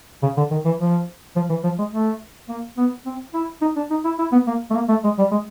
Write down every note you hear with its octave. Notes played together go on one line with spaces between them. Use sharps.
C#3
D3
D#3
E3
F3
F3
E3
F3
G#3
A3
A#3
B3
C4
E4
D#4
D4
D#4
E4
E4
B3
A#3
A3
A#3
A3
G#3
G3
G#3